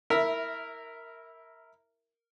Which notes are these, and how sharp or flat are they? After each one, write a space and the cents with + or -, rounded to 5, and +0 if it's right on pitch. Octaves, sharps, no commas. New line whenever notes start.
E4 -25 A#4 -10 E5 +0